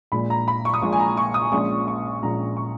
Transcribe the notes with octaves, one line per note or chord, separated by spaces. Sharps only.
A#1 A#2 G#3 B5
A#5
B5
C#6
D#6
A#1 A#2 G#3 C#6
G#5
A#5
C#6
D#6
A#1 A#2 G#3 C#4 C#6
C#6
A#1 A#2 G#3 C#4 A#5
C#6